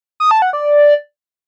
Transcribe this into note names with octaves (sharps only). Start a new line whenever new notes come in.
D#6
A5
F#5
D5